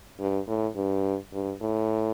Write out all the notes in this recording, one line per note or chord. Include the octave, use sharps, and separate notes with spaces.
G2
A2
G2
G2
A2